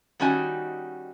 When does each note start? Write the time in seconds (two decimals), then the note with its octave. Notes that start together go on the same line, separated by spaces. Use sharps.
0.20 D#3 G3 C#4 D#4 F#4 G#5